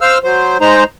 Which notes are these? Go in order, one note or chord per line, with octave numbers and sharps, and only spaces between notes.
C5 F5 E6 F6
F#3 C5
G#3 D#4 C5 A#5